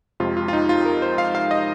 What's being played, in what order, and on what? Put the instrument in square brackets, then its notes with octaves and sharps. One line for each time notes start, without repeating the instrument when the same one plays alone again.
[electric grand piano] F2 C3 G#3 F4
F4
F4
D#4
F4
A#4
C5
F5
F5
D#5